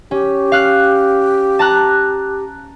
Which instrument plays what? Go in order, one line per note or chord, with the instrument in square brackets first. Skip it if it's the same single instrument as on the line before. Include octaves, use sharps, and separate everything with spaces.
[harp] C#4 [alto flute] G4
[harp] F5 F#6
A5 A#5 F#6